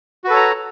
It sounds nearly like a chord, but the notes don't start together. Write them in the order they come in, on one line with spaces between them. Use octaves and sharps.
F#4 B4 A4 C#5 A#5